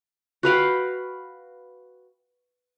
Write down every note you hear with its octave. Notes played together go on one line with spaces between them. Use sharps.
F#4 B4 F5 G5